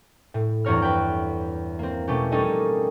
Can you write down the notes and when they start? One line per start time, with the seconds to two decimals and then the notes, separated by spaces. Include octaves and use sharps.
0.34 A2
0.64 E2 G2 C4 C#5 A#5 F6
0.82 B4 G5
1.79 A#3 C4
2.08 B2 A3 C#4 G4
2.32 G3 C#4 D#4 A4 A#4 D#5